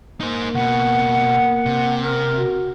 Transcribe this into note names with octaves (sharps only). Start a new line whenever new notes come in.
A#3 D#4 C5
C#2 B2 F#5
C3
A#4
F#4